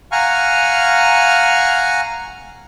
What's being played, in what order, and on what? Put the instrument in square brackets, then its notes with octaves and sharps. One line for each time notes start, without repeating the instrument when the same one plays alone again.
[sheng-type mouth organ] F5 F#5 G#5 A#5 C#6 F6